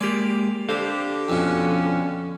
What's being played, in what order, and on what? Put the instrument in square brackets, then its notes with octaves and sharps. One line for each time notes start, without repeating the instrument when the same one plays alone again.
[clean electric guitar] G#3 A#3 G4 [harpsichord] D5
[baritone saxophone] D3 [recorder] G4 [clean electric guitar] A4 C5 F5
[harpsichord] F2 B2 [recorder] C#4